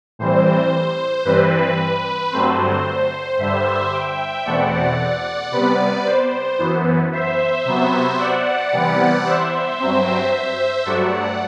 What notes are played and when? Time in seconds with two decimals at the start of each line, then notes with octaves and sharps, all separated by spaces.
0.19 A2 E3 G3 C4 C5
1.25 G2 E3 G3 C4 B4
2.32 G2 D3 F#3 A3 C4 C5
3.38 G2 D3 G3 C5 E5
3.92 E5 G5
4.45 E2 B2 A3 C4 D5 F#5
5.52 C3 G3 B3 B4 D5
6.06 C5
6.59 F#2 E3 B3
7.13 C5 E5
7.65 C3 F#3 B3
8.18 D5 F#5
8.72 C3 E3 G3 B3
9.26 C5 E5
9.79 G2 F#3 C4
10.32 C5 E5
10.86 G2 F#3 A3 D5 F#5